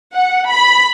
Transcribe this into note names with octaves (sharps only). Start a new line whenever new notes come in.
F#5
B5